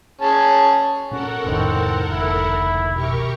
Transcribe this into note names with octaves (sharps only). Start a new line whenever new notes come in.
C#4 G#4 A5
A#2 C#4 F#4 A4 A#4 F#5
F1 C#2 A2 D#3 C4
F#1 E4
B2 G4 A#4 C#6